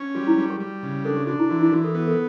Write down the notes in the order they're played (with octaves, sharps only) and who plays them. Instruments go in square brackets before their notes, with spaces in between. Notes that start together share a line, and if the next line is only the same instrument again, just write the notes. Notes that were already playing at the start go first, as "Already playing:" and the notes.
Already playing: [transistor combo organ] C#4
[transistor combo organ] G3 [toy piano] F#4
[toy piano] E4
[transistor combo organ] G3 [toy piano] F#4
[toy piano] G4
[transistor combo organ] G3
C#3
[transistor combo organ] D4 [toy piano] A4
[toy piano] G4
[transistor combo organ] D4 [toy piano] F#4
[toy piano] E4
[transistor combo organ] E3 [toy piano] F#4
[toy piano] E4
[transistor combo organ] E3 [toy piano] F#4
[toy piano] A4
[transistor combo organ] B3
[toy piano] A4